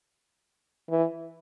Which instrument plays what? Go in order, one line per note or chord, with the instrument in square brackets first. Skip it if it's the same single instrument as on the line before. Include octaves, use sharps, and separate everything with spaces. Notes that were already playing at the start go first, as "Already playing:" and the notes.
[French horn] E3